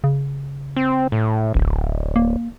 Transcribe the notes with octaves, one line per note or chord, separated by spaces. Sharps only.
C#3
C4
A2
D1 A1
A#3